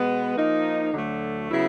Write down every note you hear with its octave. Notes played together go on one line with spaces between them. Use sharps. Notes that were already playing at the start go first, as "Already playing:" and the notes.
Already playing: B2 G#3 B3
F3 A#3 D#4
D2 D3 F#3 A3
C#3 F#3 B3 E4